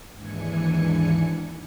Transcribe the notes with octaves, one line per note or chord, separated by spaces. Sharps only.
D#2 G#2 E3 D4 G#5 C#7